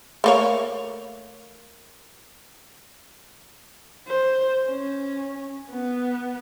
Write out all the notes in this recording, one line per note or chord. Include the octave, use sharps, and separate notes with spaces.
A3 A#3 C#5
C5
C#4
B3